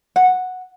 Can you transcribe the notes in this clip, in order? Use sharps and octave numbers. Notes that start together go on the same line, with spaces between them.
F#5